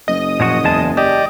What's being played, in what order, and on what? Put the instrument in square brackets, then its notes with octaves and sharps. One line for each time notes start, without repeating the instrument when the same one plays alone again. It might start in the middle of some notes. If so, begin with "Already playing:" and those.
[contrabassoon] F#1 [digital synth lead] D#5
[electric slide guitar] A#2 F3 F#4
E2 G#3 A5
[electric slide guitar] G4 [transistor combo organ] D5 D#5